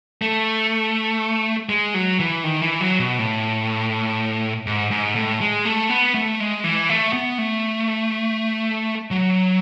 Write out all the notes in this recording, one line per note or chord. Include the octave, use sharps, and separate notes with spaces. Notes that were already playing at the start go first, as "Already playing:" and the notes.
A3
G#3
F#3
E3
D#3
E3
F#3
B2
A2
G#2
G#2
A2
G#3
A3
B3
A3
G#3
E3
A3
B3
A3
F#3